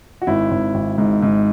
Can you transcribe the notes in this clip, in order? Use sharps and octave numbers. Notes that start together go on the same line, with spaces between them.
F#4
G#1 E4
G#1
G#1
G#2
G#2